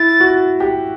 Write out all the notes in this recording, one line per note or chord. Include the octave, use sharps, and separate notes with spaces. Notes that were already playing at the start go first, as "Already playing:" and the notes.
Already playing: E4 A6
F#4
G4